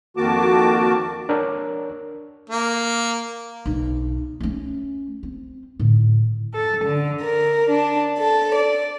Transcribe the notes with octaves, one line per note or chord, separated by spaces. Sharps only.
F2 D#3 A#3 F#4 A5 D6
D4 A#4 C#5
A#3
B1 D4
A3 C#4
C4
A2 D3
A4
D3
A#4
D4
A4
D5